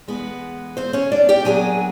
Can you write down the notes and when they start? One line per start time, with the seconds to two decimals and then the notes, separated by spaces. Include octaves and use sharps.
0.08 B2 G#3 B3 B4
0.13 E2
0.77 C4 C5
0.93 C#4 C#5
1.12 D4 D5
1.29 G4 G5
1.45 A#2 F#3 B3 D4 G#4 G#5